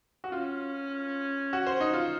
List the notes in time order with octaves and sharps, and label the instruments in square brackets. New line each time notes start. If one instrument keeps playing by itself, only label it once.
[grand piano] F#4
[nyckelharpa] C#4 [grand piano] F4
[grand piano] F#4
C5
D#4
F4